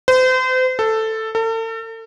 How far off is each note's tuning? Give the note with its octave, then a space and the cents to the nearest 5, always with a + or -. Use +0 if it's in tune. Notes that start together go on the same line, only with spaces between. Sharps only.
C5 -35
A4 +5
A4 +40